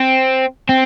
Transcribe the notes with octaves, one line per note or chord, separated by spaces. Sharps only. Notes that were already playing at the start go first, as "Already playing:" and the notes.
Already playing: C4
C4